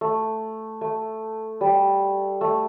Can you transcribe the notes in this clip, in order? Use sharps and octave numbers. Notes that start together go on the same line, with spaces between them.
A3
A3
G3
A3